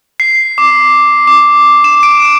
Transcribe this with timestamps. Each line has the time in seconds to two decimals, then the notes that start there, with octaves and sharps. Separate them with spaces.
0.20 C7
0.58 D6
1.27 D6
1.84 E7
2.03 D7